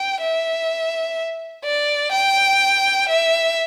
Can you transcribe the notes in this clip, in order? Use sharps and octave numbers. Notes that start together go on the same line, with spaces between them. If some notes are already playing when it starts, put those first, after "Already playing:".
Already playing: G5
E5
D5
G5
E5